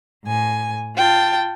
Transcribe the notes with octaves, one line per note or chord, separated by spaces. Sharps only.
A2 G#5
F4 G5 A5